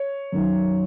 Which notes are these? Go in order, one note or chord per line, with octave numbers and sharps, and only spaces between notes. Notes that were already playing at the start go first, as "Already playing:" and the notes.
Already playing: C#5
F#2 D#3 F#3